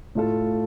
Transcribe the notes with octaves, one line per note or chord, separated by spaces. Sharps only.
A2 A3 F4 A4